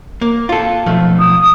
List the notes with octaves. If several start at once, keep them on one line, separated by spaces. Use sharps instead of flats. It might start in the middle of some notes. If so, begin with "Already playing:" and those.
A#3
F4 A4
B1 F3 A3
D#6